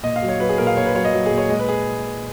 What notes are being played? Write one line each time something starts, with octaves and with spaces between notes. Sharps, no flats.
A#2 D#5
F5
F#3
C#5
F#3 B4
G#4
A#2 A#4
F5
A#2 C#5
B4
F#3 C#5
D#5
F#3
G#4
A#2
C#5
G#3 D#5
B4
G#4